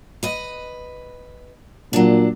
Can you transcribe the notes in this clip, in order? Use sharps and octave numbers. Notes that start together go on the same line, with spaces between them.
B4 D#5
A#2 F#3 D4